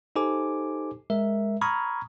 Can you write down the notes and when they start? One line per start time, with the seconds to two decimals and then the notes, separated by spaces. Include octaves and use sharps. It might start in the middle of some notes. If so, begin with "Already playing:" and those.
0.16 D#4 G4 A4 C5 G#5 D6
1.10 G#3 A#4 E5
1.61 A#5 B5 C#6 D#6 F6 G#6